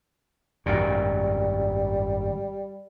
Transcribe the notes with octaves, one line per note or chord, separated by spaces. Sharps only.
G#1 F#2 A#2 G3